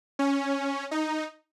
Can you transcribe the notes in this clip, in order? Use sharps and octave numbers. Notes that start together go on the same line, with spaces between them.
C#4
D#4